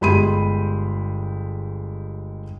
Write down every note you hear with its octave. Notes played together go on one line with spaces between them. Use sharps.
G1 G#3 G4 B5 C6 D#7